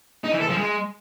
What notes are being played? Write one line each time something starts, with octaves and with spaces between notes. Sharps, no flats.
D#4
E3
A4
F3
G#3